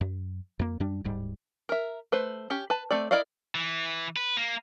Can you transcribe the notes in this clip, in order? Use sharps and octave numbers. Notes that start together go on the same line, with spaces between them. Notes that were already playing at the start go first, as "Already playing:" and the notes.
F#2
F2 A#3
F#2 G3 D4
D1 G#2 G3
A#4 E5
A3 B4 C5
C#4 G4
B4 A5
A3 C4 D5
E4 A#4 D5 D#5 F5
E3
B4
A#3